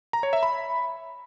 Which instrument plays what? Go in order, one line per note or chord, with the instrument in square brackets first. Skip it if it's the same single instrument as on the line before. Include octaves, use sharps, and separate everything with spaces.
[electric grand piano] A#5
C#5
E5
B5